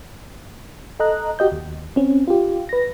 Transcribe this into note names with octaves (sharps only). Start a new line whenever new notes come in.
A4 D#5 A#5 F#6
F#4 G4 D#5 G6
D#2
C4 C#4
F4 G4
B4 A#6